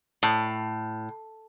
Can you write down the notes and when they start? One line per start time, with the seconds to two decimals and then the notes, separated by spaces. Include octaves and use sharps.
0.23 A2